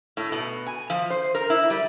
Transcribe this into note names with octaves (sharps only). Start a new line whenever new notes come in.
A2
B2
G#5
F3
C5
A#4
E4
G3